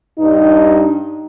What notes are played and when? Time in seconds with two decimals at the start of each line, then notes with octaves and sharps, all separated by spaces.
0.19 G2 D#4